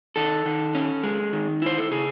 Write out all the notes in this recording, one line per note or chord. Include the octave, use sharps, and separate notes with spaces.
D#3 A4
D#3
C#4
G#3
D#3
E4 C5
A4
C#3 G#4